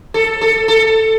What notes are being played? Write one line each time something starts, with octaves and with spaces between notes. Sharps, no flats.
A4
A4
A4